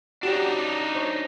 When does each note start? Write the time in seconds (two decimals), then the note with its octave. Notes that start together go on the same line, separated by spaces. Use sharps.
0.23 D4 D#4 F#4 G4 C#5
0.95 C5 C#5